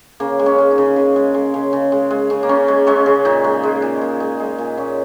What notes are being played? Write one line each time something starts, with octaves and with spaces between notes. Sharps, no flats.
C#3 A#3
G#3
C#4
G#3
D#4
C#3
C#3
G#3
G#3
C#3
C#3
G#3
G#3
C#3
A#3
C#3 C#4
G#3
G#3 C#4
C#3
A#2 D#4
G#3
G#3
A#2
A#2
G#3
G#3
A#2
A#2 C#4